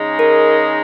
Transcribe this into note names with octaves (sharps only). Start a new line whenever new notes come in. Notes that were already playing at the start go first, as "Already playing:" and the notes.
Already playing: C#3 G#3 D#4
A#4